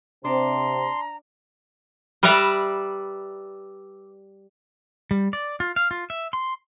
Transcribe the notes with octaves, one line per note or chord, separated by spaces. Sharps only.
C3 C4 D4 A#5 C6
G3 B4 D5 E5 A#5
G3
D5
F4
F5
F4
E5
C6